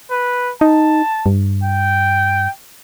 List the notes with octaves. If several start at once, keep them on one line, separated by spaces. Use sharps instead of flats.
B4
D#4 A5
G2
G5